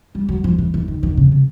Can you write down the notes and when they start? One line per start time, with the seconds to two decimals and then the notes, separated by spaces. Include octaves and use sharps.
0.15 G3
0.29 F#3
0.44 F3
0.58 E3
0.74 E3
0.88 D#3
1.03 D#3
1.17 C#3
1.32 C3